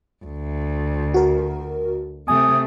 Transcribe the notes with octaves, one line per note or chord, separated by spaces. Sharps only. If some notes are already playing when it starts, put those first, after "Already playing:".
D2
F#4 A#4
C3 A3 G#5 D#6